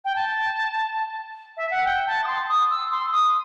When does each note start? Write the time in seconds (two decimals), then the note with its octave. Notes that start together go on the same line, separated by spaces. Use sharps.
0.05 G5
0.16 A5
1.57 E5
1.71 F#5
1.85 G5
2.07 A5
2.24 D#6
2.27 C6
2.49 D#6
2.70 E6
2.91 C6
3.12 D#6